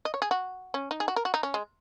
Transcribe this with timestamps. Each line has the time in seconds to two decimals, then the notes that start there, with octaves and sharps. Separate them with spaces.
0.05 D#5
0.14 C#5
0.22 G#4
0.31 F#4
0.74 C#4
0.91 D#4
1.00 G#4
1.08 F#4
1.16 A#4
1.25 F#4
1.34 D#4
1.43 C#4
1.54 G#3